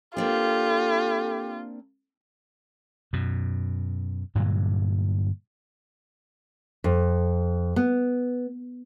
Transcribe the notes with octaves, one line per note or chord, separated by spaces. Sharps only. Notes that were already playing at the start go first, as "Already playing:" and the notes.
A#3 C4 D4 F4 G4 A4
F#2 B2
G2 A#2 D3 F#3
F2
B3